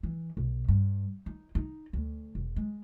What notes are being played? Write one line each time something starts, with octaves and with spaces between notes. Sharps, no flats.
E3
B1
G2
D#4
D#4
D2
E1
G#3